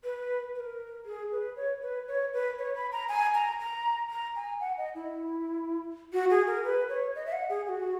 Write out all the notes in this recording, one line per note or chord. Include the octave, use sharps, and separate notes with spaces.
B4
B4
A#4
G#4
B4
C#5
B4
C#5
B4
C#5
B5
A#5
G#5
A#5
A#5
A#5
G#5
F#5
D#5
E4
F#4
G#4
A#4
B4
C#5
D#5
E5
F#5
G#4
G#4
F#4